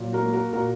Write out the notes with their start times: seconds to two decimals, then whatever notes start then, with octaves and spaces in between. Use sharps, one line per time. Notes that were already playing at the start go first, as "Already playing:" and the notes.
Already playing: A#2 F#3
0.13 F#4 A#4
0.23 A#3
0.33 F#4 A#4
0.53 A#2 F#4 A#4